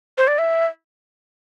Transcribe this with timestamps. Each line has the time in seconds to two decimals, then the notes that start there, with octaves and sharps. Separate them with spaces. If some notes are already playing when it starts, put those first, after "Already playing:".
0.18 C5
0.27 D5
0.39 E5